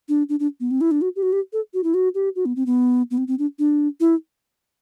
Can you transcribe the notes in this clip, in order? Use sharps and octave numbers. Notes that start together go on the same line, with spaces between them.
D4
D4
D4
B3
C4
E4
D4
F#4
G4
F#4
G4
A4
F#4
E4
F#4
G4
F#4
B3
C4
B3
B3
C4
C4
D4
D4
E4